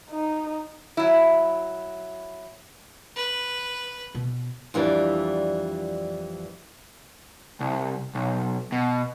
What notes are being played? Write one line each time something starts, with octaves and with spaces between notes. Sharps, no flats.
D#4
F#3 E4
B4
B2
F2 E3 G3 D4
C2
B1
B2